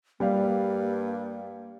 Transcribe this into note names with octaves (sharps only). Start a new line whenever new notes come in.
G2 G3 A#3 D5 F5